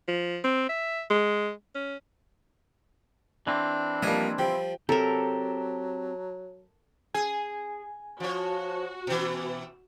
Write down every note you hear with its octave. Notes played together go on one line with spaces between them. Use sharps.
F3
C4
E5
G#3
C#4
E3 C4 D4
F3 G3 A#3 D#5 E5 G#5
F3 G3 G5
F#3 C4 G4 A4 A#4 A5 A#5
G#4 G#5
F3 F#4 C#5
B2 E3